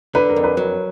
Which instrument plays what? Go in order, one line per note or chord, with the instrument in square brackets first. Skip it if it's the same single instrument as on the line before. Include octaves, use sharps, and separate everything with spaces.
[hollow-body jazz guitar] D3 [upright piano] B4
[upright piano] A#4
[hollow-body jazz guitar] F2
[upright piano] B4
[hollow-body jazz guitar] F#3 [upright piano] A#4